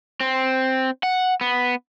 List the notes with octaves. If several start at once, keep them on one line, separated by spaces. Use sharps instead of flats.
C4
F#5
B3